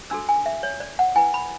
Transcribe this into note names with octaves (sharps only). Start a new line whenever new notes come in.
D4 F#4 A4 E6
G#5
E5
C#5
D5
F#5
E4 B4 G#5
B5